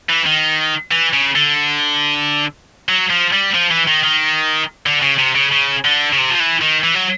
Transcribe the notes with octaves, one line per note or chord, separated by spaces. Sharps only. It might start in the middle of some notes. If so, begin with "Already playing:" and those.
E3
D#3
E3
C#3
D3
F#3
F3
G3
F3
E3
D#3
D#3
D3
C#3
C3
C#3
C#3
D3
C#3
C3
F3
E3
D#3
E3
F#3